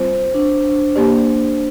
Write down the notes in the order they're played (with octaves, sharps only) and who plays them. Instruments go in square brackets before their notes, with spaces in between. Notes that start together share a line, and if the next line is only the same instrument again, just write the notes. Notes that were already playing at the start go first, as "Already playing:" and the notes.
Already playing: [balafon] G3 C4 F4 [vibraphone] C5
[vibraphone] D4
[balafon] A#3 G4 D5